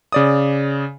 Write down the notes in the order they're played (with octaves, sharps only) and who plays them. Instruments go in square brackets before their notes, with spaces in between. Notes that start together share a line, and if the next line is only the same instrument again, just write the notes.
[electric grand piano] C#3 D5 D#6